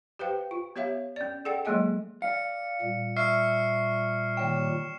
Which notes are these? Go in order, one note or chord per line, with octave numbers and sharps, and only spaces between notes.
G4 B4 C5 F5 G5
F4
B3 G4 C#5 E5 F5
C#4 D5
G#4 A4 D5 F#5 G5
F#3 G#3 A#3 G#4 D#5 G#5
D5 F5 C#7
A#2 G3
E5 C#6 F6 C7
D#2 C#5 G5 E7